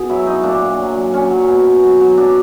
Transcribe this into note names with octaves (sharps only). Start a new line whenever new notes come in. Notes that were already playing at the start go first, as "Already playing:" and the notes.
Already playing: B2 G#4
F#3 E4
F#3 D#4
A#2 D4
A#2
F#3
F#3
F#3 C#4
F#3
B2
B2
F#3
F#3
F#3 D4